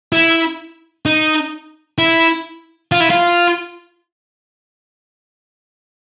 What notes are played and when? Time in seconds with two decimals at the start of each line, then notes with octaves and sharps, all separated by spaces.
0.13 E4
1.06 D#4
1.98 E4
2.92 F4
3.00 E4
3.10 F4